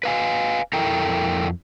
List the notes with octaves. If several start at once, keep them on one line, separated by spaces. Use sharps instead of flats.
B4 F5 G#5
F2 E4 A4 A#4 G5 A#5